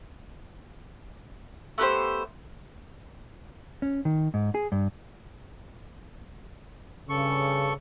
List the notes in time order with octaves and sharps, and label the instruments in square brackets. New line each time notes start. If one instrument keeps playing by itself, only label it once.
[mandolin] A3 B3 G4 C5
[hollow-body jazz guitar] C#4
D#3
G#2
G#4
G2
[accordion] G2 A4 C#6 [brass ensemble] C#3